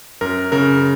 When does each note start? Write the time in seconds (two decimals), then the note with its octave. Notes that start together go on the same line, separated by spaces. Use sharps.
0.21 F#2 A#4
0.52 C#3 A#4